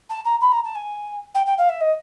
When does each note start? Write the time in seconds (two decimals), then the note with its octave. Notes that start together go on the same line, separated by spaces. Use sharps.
0.09 A5
0.24 A#5
0.40 B5
0.51 A#5
0.64 A5
0.75 G#5
1.34 G5
1.45 G5
1.57 F5
1.69 E5
1.80 D#5